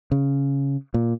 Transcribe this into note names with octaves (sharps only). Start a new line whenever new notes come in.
C#3
A#2